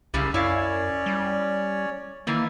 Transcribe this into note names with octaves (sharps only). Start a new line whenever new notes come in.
C2 F#2 C#3 G3
F#2 C#4 E4 C#5 D5 F5
G3
D#3 E3 A#3